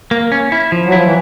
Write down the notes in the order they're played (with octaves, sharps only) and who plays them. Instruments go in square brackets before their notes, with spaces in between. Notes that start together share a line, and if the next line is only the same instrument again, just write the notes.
[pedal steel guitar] A#3
C#4
E4
F3
[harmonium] F#3
[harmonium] F3 [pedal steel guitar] E4
[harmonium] E3